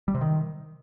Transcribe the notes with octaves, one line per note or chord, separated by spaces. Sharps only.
G3
C3
D#3